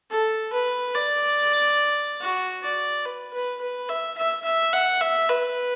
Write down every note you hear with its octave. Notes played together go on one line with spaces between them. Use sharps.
A4
B4
D5
F#4
D5
B4
B4
B4
E5
E5
E5
F#5
E5
B4